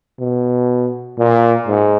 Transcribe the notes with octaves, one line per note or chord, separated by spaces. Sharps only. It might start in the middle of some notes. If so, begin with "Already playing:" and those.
B2
A#2
G#2